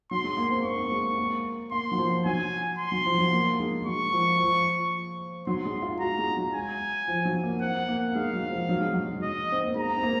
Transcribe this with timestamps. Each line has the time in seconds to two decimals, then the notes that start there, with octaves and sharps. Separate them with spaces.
0.11 F#3 C6
0.24 G#3
0.37 A#3
0.50 C4
0.64 A#3 C#6
0.76 C4
0.83 A#3
0.92 G#3
1.17 A#3
1.72 A#3 C6
1.92 F#3
1.98 F3
2.25 F#3 G#5
2.79 C6
2.92 F#3
3.06 F3
3.18 F#3
3.32 A#3
3.60 G#3
3.86 F#3 C#6
4.13 F3
4.39 F3
5.46 F#3 C6
5.65 G#3
5.82 F4
6.00 F#4 A#5
6.19 G#3
6.37 F#3
6.54 G#5
7.08 F3
7.25 F#3
7.43 A#3
7.61 C4 F#5
7.88 A#3
8.15 G#3 F5
8.33 F#3
8.51 F3
8.69 F#3
8.81 G#3
8.93 F#3
9.04 G#3
9.16 F#3
9.23 D#5
9.52 C4
9.65 A#3
9.76 G#3 A#5
9.97 C4
10.03 A#3